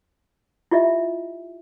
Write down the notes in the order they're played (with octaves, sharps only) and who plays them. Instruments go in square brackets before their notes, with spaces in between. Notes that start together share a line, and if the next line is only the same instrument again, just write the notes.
[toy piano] E4 F4 G4 D#5 E5